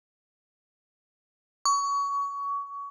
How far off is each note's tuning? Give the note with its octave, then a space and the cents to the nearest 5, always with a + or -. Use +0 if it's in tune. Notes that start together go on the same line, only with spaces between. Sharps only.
C#6 +25